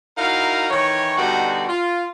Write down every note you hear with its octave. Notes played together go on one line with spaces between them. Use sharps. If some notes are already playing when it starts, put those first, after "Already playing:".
D#4 E4 F#4 A#4 F5
D#3 E3 C#5
B2 D3 G3 D#4 F#4
F4